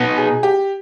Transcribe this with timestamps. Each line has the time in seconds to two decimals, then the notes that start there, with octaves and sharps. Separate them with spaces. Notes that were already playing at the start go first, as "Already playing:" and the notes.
Already playing: B2 B3 D#4
0.17 G#4
0.43 G4